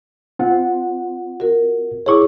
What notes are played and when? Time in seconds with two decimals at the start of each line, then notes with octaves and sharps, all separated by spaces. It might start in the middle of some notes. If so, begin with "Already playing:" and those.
0.39 C4 F4 F#5
1.40 F#4 A#4
2.06 E4 G#4 C#5 C#6 D6